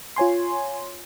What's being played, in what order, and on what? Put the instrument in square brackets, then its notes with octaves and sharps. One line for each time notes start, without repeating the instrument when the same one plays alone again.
[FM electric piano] F4 C#5 G#5 C6